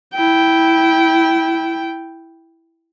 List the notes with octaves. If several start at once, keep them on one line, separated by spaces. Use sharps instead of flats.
E4 G5